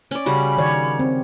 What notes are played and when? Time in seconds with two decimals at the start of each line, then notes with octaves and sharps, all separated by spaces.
0.11 C#4 D5
0.26 C#3 G3 F#4 B5
0.58 D#3 C#5 D5
0.99 C4